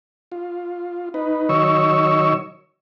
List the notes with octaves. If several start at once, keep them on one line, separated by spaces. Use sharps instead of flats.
F4
D#4 B4
D#3 F#3 C#5 D#5 C#6 E6